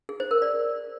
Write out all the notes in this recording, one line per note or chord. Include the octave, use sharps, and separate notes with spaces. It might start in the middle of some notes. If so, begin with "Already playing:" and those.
G#4
C5
A#4
D5